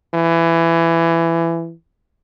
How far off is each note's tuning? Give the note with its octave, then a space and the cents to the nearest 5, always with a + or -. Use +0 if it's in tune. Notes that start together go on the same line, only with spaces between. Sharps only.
E3 +20